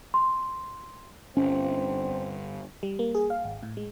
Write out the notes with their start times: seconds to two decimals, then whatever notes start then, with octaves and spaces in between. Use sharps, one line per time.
0.14 C6
1.37 G1 C4 C#4
2.83 G3
2.99 A#3
3.15 G#4
3.30 F5
3.44 G#1
3.63 A2
3.77 G#3